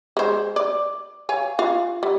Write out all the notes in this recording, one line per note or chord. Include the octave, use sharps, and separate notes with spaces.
G#3 C5
D5
C#5 F5 G#5
F4 F5
G3